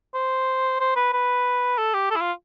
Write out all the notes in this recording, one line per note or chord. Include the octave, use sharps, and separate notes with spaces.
C5
C5
B4
B4
A4
G4
A4
E4
F4